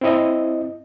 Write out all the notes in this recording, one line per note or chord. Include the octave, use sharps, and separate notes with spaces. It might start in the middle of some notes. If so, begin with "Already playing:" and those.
C4 E4 D#5